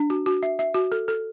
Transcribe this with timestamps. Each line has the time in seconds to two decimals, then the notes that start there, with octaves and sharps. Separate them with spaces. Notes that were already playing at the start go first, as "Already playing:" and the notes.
Already playing: D4
0.10 F#4
0.26 F#4
0.43 E5
0.59 E5
0.74 F#4
0.92 A4
1.08 A4